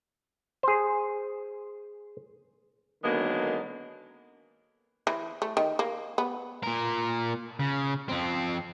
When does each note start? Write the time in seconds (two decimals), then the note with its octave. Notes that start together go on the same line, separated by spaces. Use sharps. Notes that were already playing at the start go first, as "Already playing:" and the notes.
0.63 G#4 C5
3.03 D3 D#3 F#3 G#3 A#3 B3
5.07 E3
5.42 A3
5.57 D#3
5.79 A#3
6.18 B3
6.63 A#2 A#4
7.60 C#3
8.08 F2 C4